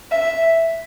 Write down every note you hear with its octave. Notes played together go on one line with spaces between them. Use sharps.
E5